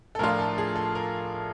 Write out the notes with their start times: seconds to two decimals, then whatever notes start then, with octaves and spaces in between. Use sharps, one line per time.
0.15 A4
0.19 A2 F3 A3 D4 F4 A#4
0.39 A4
0.58 G#4
0.76 A4
0.95 A#4